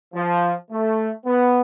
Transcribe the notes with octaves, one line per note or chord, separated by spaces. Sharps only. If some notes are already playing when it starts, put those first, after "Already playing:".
F3
A3
B3